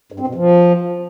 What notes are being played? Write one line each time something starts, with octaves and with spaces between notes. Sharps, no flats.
G2
C4
B2
F3